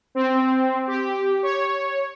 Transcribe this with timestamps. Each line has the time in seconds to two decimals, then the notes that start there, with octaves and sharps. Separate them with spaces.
0.15 C4
0.87 G4
1.43 C#5